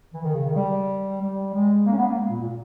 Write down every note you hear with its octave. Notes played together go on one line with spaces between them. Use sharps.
E3
D#3
C#3
D#3
G3
G3
G#3
A#3
C#4
B3
A#3
G#3
A#2
A#2